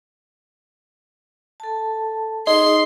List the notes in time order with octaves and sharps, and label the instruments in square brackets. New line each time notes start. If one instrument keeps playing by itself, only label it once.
[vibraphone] A4 A5
[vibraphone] D#4 G#4 [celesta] D#5 [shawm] C6 [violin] C7